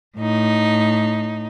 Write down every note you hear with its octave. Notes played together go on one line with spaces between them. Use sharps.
A2 D#4